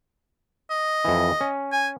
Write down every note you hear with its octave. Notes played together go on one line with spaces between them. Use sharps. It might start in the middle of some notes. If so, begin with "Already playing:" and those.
D#5
F2 E3
C#4
G#5